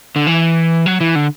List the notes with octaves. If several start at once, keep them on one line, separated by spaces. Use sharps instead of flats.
D3
E3
F#3
E3
D3